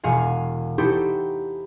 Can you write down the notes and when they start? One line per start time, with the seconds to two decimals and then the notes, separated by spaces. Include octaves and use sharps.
0.03 E1 F#4 F5 G#5
0.78 D#4 E4 F#4 G4 A4 C5